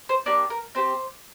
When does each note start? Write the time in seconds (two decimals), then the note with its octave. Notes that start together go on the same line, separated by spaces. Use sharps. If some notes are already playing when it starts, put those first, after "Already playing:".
0.09 C5
0.26 A#3 D4 G4 D5
0.50 A#4
0.75 C4 G4 C5